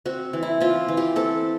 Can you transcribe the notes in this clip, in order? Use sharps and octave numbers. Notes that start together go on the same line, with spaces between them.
C4 F#4
E3
E4
C4 F4
E3
G4
C4 A4